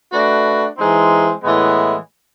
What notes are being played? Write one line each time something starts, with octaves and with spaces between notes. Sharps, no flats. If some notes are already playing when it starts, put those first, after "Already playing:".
A3 D4 F#4 B4
E3 G#3 C4 D#4
A2 E3 G#3 B3